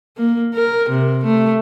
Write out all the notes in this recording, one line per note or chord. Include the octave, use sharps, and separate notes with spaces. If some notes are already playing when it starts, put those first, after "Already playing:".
A#3
A#4
C3
A3